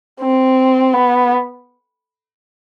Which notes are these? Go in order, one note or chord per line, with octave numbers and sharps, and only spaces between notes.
C4
B3